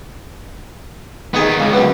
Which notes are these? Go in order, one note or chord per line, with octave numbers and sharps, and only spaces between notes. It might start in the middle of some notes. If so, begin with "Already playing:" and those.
D#3 B3 D#4 G#4
C#2 C#3
F#2 B3